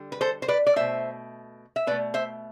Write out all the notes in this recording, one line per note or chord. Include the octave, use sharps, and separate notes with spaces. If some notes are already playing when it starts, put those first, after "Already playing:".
Already playing: D3 G3
B4
A4 C5
C5
B4 D5
D5
B2 A3 C5 E5
E5
B2 A3 B4 D5
C5 E5